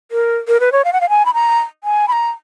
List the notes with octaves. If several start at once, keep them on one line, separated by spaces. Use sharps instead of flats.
A#4
A#4
B4
C#5
F5
F#5
F5
G#5
B5
A#5
G#5
B5
A#5